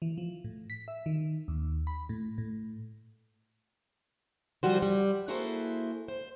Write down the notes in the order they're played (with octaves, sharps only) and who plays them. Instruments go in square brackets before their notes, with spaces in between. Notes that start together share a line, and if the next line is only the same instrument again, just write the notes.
[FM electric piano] E3
F3
A2
B6
E5
D#3
D#2
B5
A2
A2
[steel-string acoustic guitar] F3 G3 F#4 C5
G3
A#3 E4 F#4 G#4 A4 C5
C5